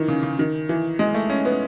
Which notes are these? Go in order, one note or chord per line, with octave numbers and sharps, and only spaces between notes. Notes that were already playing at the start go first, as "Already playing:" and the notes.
Already playing: D#3 E3
C#3
C#3
D#3
E3
G#3
A3
C#4
B3